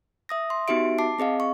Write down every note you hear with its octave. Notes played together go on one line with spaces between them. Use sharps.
E5 D#6 A#6
C6
B3 D#4 F#4 G4 E5 D7
A5 D6 C7
C4 G#4 D#5 F5
C#6